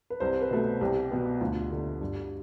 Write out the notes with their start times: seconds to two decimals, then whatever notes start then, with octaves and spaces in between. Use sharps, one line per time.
0.10 B4
0.20 C2 C5
0.41 B4
0.51 B2 A3
0.81 C2 G4
1.11 B2 B3
1.41 D2 F4
1.71 D3 A3
2.01 G2